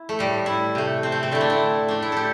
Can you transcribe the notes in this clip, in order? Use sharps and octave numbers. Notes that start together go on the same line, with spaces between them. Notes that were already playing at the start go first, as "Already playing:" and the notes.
Already playing: E4
A3
A2 G3
E4
C3 A3
C4
A3
C4
D3 A3 E4
D4
E4
A2 A3 D4
E4
G4 A4